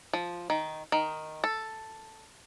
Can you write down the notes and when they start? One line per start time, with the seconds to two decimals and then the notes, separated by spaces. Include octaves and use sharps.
0.13 F3
0.50 D#3
0.92 D#3
1.44 A4